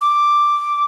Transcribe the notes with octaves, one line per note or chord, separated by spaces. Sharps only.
D6